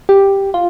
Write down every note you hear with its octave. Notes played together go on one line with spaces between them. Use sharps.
G4
F4